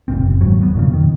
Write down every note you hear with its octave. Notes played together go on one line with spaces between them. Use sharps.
F#1 D#2 A#2 C4
F#1
D#2 G#2 F#3
F#3 B3
F2 A#2 C#3
D#3